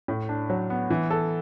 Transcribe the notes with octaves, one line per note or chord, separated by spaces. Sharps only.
A2
D4
F#3
B3
E3
A4